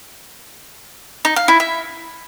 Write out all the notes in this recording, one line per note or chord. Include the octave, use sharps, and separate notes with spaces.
D#4
F5
E4
E5